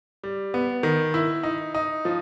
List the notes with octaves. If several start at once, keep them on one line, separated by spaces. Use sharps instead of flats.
G3
B3
D#3
E4
D#4
D#4
F3